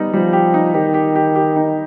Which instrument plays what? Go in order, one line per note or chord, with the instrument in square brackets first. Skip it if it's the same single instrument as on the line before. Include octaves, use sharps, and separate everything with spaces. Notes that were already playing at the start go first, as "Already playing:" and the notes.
Already playing: [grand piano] G3 B3 D#4
[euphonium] F3 [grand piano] G3
[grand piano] G4
D#4
[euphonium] D#3 [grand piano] G4
[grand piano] G4
G4
G4
D#4